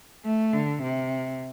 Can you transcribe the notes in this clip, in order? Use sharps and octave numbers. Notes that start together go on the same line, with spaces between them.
A3
D3
C3